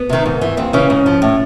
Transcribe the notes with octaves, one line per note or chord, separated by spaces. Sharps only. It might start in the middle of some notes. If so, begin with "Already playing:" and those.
Already playing: B3
C3 D#3
G#2
E3
D#2 C4
C#3 E3 C#4
G#2
F3
A2